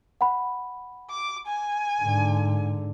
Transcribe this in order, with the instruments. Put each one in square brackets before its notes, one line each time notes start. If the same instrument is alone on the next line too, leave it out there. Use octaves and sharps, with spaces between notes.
[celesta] F#5 B5
[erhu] D6
G#5
[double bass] G#2 D3